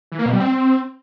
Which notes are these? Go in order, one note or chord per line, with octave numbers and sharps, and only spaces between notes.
E3
A#3
B2
G3
C4